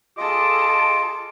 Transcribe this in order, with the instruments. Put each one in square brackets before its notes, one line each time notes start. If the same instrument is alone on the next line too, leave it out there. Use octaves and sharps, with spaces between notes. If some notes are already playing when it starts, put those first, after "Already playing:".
[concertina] F4 D#5 [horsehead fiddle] G#4 A4 [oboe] D6